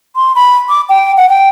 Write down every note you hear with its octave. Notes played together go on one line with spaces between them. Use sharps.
C6
B5
D6
G5
F#5
G5